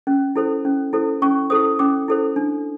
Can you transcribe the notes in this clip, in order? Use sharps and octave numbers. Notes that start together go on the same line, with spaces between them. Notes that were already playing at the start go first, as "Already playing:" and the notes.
C#4
E4 A4 C5
C#4
E4 A4 C5
C#4 C#6
E4 A4 C5 D#6
C#4 D6
E4 A4 C5
D4